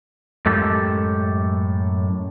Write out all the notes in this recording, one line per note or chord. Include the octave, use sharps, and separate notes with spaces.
F#2 A2 G#3 G4 A4